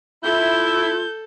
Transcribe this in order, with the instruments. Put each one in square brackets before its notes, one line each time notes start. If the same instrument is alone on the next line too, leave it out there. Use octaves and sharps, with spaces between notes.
[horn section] E4 [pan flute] F4 [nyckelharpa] A4 [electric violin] G6